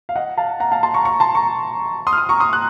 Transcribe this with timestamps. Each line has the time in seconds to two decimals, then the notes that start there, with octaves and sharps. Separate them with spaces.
0.09 F5
0.15 D#5 F#5
0.37 F5 A5
0.60 F#5 A#5
0.72 F5 A5
0.83 A5 C6
0.94 A#5 C#6
1.05 A#5 C#6
1.20 A5 C6
1.35 A#5 C#6
2.07 C6 D#6
2.13 F6
2.18 C6 D#6
2.29 A#5 C#6
2.40 C6 D#6
2.53 F#6